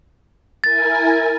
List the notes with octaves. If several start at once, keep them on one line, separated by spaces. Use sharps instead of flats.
E4 A#4 G#5 A6